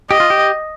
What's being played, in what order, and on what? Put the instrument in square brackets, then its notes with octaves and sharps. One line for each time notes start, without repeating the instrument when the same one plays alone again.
[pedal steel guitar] G4 [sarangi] D#5
[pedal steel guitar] F4
G4